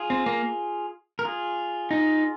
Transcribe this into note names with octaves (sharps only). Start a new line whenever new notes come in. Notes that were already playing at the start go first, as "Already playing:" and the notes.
Already playing: F4 G#4
C4
A#3
A#4
F4 G#4
D#4